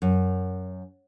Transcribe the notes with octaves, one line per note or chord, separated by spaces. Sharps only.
F#2